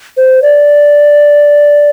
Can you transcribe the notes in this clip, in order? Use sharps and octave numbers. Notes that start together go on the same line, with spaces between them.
C5
D5